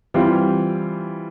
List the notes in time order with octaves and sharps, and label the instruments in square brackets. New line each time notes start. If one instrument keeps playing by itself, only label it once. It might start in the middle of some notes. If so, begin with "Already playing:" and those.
[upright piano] E3 G3 C4 F4